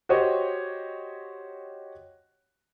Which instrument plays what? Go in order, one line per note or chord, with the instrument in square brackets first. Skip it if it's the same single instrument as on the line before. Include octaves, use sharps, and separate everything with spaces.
[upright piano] F#4 G4 C5 C#5 D#5